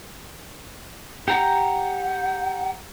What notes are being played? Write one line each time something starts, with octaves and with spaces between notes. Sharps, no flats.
G4 F#5 A#5